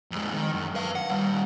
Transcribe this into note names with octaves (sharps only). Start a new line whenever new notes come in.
F2 G#3
D#3
F#2
B4 F5
F#5
D#2 G3